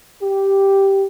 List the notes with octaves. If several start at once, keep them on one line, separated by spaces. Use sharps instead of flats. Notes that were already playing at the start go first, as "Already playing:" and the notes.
G4